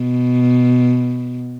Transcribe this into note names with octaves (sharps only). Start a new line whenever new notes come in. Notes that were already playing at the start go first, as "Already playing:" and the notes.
Already playing: B2